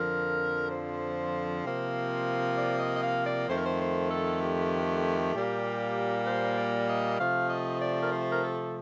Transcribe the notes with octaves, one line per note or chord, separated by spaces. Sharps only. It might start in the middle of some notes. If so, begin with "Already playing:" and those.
Already playing: F2 D3 F3 A#4
C5
C3 F3 A#3
D5
D#5
D#5
F5
D5
F2 D#3 A3 C5
A#4
C5
C5
A4
G4
A#2 G3 A#3
C5
D5
D#5
C3 F3 A3 F5
D#5
D5
A#4
C5
A#4
A4